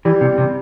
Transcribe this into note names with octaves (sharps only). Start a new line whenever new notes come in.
E3 G3
C3
C3